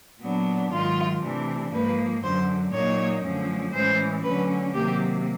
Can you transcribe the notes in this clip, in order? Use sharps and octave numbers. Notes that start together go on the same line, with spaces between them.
A#2 F#3 B3 D4
G#2 D#3 F#3 F4
C3 E3 A3 D4
G#2 F3 A#3 B4
F#2 D3 F#3 C5
A#2 F#3 A#3 D#4 C#5
F#2 D3 F3 A3 C#4
A2 E3 G#3 C#4 C5
D3 F#3 A3 C#4 B4
C3 D#3 F#3 A#3 G4